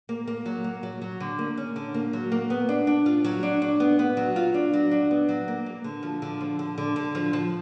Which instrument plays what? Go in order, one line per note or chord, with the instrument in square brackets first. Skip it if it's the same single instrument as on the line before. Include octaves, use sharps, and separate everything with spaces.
[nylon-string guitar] A#3
A#3
F#3
A#3
F#3
F#3
D3
A#3
C#4
D3
A#3
F#3
A#3
B3
D4
D4
F4
F#3
D4
D4
B3
B3
F#3
F4
D4
F#3
D4
B3
F#3
A#3
A#3
D3
F3
D3
F3
D3
D3
D3
F3
F3